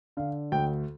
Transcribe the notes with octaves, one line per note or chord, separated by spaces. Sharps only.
D3 F5
D2 G5